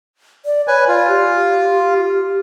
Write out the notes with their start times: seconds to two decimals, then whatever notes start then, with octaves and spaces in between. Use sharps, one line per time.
0.46 D5
0.68 B4 C#5 G#5
0.88 F4 D5
1.08 G4